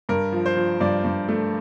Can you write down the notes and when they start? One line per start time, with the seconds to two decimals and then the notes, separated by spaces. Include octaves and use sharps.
0.09 G2 A#4
0.32 F3
0.46 C5
0.56 F3
0.80 G2 D5
1.05 G2
1.28 A3